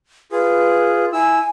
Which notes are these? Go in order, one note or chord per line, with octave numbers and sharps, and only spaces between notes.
F4 G#4 B4
E4 G#5 E6